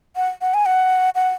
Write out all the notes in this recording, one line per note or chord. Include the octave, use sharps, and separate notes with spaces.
F#5
F#5
G#5
F#5
F#5